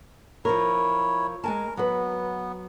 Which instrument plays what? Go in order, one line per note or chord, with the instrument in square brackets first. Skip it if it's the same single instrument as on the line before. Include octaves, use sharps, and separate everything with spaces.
[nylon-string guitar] F3 A#4 [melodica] E4 C#5
[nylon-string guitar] G#3 G#5 A5 [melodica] A#4
[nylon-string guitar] F#3 B4 [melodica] B3